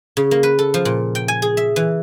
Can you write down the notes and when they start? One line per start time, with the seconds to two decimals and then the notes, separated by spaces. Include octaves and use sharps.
0.17 C#3
0.31 A#3
0.43 B4
0.59 A4
0.74 F3
0.85 A#2
1.15 G5
1.28 G#5
1.42 G#4
1.57 E5
1.76 E3